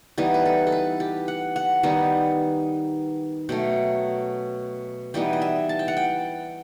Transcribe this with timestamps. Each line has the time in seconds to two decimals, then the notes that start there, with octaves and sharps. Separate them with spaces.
0.18 E3 G3 B3 D#4
0.34 B4
0.46 A4
0.67 A4
0.72 B4
1.00 G4
1.28 F#5
1.56 F#5
1.83 D#3 G3 B3 D#4
3.49 B2 F#3 A3 G5
5.14 E3 G3 B3 D#4 G5
5.33 D#5
5.42 E5
5.69 A5
5.79 G5
5.88 F#5
5.97 G5